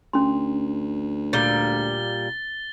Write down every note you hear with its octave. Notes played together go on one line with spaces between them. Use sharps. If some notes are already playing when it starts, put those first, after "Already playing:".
D2 C#4 C6
A#2 G3 A6 G7